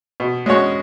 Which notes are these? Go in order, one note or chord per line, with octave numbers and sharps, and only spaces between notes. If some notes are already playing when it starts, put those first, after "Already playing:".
B2
G#3 C#4 F#4 C#5